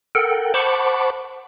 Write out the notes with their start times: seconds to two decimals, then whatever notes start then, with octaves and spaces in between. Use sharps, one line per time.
0.15 A4 A#4 F#5 G5
0.54 C5 F#5 A5 B5 C#6 D6